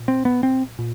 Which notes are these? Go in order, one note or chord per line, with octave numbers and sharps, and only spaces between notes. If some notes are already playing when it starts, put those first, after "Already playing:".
Already playing: A#2
C4
B3
C4
A#2